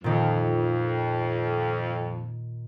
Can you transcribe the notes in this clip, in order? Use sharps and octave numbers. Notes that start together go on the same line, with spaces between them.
F2 A#2 D#3